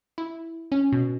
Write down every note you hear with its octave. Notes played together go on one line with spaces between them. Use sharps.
E4
C#4
B2